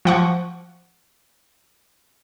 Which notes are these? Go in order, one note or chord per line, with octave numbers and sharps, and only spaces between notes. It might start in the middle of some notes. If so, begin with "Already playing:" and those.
F3 F#5 C#6